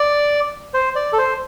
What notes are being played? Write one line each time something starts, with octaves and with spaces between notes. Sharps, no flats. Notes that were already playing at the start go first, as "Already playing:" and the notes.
Already playing: D5
C5
D5
A4
C5